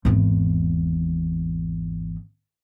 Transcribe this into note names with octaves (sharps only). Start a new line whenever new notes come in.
G#1 E2